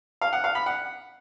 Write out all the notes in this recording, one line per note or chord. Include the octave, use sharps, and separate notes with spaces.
F5
F#5
F5
B5
F#5